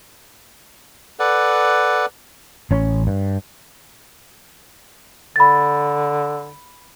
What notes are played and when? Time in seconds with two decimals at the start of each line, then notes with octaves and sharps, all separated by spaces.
1.19 A4 B4 D5 F#5
2.71 A1 C#4
3.07 G2
5.36 D3 B5 A6